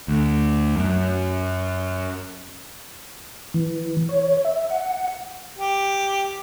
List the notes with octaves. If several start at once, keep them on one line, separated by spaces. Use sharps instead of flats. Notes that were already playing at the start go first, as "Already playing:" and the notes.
D2
F#2
E3
C#5
E5
F#5
G4